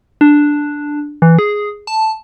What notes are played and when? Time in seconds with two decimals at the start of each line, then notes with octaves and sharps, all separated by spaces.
0.21 D4
1.22 E3
1.39 G#4
1.87 A5